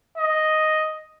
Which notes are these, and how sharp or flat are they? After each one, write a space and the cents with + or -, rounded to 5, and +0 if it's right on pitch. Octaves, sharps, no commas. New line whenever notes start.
D#5 +0